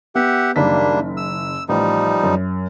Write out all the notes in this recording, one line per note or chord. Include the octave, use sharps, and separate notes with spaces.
B3 G4 E5 F#5
F#1 D#3 G3 A#3 D4 B6
E6
A1 F3 G3 D#4
F#2